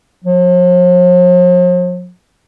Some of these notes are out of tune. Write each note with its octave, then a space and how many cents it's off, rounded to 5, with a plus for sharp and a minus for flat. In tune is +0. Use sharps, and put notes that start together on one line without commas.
F3 +45